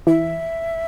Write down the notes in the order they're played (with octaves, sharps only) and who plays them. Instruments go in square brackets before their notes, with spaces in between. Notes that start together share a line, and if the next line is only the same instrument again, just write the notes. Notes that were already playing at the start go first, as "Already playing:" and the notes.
[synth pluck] E3 [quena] E5